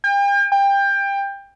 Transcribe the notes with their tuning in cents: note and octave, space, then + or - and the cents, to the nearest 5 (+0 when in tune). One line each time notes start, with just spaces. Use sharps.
G5 +40
G5 +20